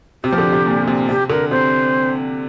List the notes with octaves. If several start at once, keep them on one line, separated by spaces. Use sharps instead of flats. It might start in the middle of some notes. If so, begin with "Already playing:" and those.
C3 G4
F3
D3
C3
A#2
A#2
C3
C3 G4
D3 A#4
C3 C5